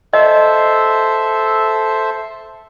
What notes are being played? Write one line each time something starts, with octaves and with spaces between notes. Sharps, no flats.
A4 C5 D#5 E5